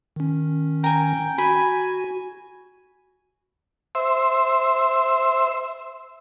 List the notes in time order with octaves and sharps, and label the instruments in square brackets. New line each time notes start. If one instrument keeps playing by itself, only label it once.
[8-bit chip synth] D#3 C#4
[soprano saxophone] G5 [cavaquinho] G#5 A#5
[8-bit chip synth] F#4 [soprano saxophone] G#5 [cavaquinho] B5
[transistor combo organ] C5 E5